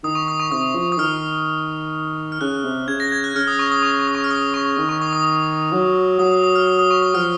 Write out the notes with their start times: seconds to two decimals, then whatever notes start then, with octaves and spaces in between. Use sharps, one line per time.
0.04 D#3 D#6
0.15 C#6
0.28 D#6
0.40 C#6
0.51 C3 D#6
0.75 F3
0.92 D#6
0.99 D#3 F6
2.32 F6
2.41 C#3 F#6
2.65 C3
2.88 C#3 G#6
3.00 A#6
3.12 G#6
3.24 F#6
3.35 C#3 F6
3.47 D#6
3.59 C#6
3.72 D#6
3.83 C#6
3.99 C#6
4.08 D#6
4.15 C#6
4.24 F6
4.31 D#6
4.54 C#6
4.78 D#3
4.89 C#6
5.02 D#6
5.13 D#6
5.25 D#6
5.73 F#3
6.19 F#3 D#6
6.32 D#6
6.44 D#6
6.56 F6
6.67 D#6
6.79 D#6
6.91 C#6
7.03 D#6
7.15 F3 F6